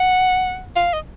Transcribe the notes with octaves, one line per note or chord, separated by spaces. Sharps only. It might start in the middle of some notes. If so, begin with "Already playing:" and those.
Already playing: F#5
F5
D#5